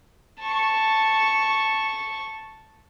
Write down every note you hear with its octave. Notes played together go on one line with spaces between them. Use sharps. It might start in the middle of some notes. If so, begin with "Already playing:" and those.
A5 C#6